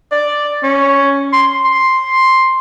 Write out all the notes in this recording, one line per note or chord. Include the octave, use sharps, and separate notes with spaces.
D5
C#4
C6
C6